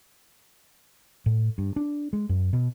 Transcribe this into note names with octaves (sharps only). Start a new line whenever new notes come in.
A2
G2
D4
G#3
F#2
B2